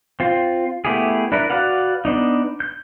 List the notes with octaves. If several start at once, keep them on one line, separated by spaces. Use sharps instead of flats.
C4 F4
A3 B3 E4 G4 G#4
D4 E4 A#4 B4
F#4 B4 D5 F5 F#5
B3 D4 D#4
G6